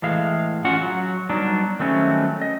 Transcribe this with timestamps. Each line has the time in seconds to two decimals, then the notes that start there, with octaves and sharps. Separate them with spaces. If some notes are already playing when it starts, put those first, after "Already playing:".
0.02 A2 E3 G#3 F5
0.65 C#4 F4 F#4 F#5
0.82 F#3
1.29 F#3 G3 B3 D4 D#4
1.80 D#3 F#3 G3 A3 C4 C#4
2.42 D#5